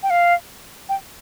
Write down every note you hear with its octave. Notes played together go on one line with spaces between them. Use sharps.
G5
F5
G5